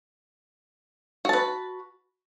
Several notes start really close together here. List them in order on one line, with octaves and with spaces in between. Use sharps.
F#4 A5 B4